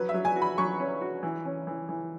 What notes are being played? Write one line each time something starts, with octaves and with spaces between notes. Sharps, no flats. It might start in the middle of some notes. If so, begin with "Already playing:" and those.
Already playing: F#3 B4
E5
F#3
G#5
F#4
B5
F#3 C#6
C#4
F#4
E3
C#4
E3
E3